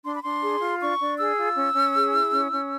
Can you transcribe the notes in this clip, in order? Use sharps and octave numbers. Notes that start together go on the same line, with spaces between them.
D4 C6
B5
D4 C6
G#4
F4
D4 C#6
D4
G#4 E6
F4
C#4
C#4
G#4
E4
C#4
C#4